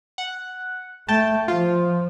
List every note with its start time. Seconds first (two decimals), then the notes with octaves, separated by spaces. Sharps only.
0.18 F#5
1.09 A3 G5 A5
1.48 F3 F4